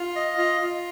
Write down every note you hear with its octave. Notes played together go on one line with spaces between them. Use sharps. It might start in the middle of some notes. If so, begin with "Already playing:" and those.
Already playing: F4
D#5
F4
F4